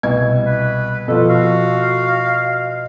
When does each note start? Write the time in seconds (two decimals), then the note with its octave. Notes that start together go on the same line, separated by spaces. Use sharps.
0.03 C2 B2 G#6
0.46 B4
1.08 B2 F3 A4
1.29 F#4 F5